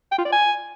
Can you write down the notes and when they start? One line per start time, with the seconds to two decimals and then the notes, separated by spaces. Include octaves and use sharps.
0.12 G5
0.19 F4
0.25 D5
0.32 G#5